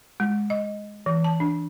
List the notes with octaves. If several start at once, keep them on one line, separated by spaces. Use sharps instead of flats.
G#3
D#5
E3
A5
D4